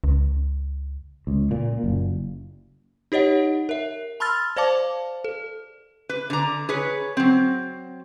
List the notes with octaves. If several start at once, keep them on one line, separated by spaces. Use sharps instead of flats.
C#2
C#2
A#2
F#1
D#4 G4 C#5 D#5 F#5
A#4 E5
A5 B5 C6 E6 F6 A6
C5 D5 F5 A5 D6
A4
B4
D3 A#5
G#4 B4 C#5
F#3 C4